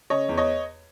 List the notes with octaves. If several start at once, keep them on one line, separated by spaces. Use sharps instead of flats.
C#3 C#5 D#5
E2
C#5 D#5